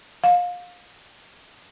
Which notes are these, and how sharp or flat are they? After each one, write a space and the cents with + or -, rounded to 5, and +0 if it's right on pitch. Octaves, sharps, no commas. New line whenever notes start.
F5 +30